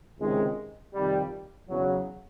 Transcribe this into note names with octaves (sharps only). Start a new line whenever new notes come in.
C#2 C3 D#3 G#3
F2 C3 D#3 G3
E2 C#3 F#3